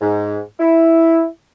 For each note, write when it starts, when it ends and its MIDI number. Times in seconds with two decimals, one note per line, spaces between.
0.01 0.40 44
0.59 1.25 64